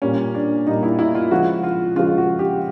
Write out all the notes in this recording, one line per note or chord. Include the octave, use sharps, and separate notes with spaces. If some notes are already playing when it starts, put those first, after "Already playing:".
A#2 G3 A#3 C#4
D4
A#2 G3 A#3 D#4
E4
E4
F4
C#3 F3 G#3 F#4
F4
C#3 F3 G#3 F4
F#4
G4